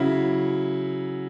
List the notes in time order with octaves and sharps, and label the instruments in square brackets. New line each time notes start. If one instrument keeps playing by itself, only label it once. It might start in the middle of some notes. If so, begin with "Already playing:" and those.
Already playing: [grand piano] C#3 F#3 E4